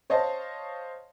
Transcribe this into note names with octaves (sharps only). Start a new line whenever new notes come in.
C5 C#5 D#5 F5 A5